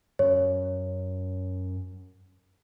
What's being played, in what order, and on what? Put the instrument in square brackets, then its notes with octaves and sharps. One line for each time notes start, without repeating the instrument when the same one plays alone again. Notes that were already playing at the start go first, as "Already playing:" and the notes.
[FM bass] F#2 [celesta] C#5